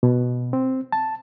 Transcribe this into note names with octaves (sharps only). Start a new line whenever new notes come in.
B2
C4
A5